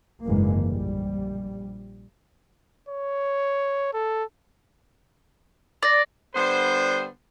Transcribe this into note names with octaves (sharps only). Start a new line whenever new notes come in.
F#1 D2 G#2 E3 G#3 A#3
A#1 G3
C#5
A4
D5 A6 A#6
D3 G3 B3 C5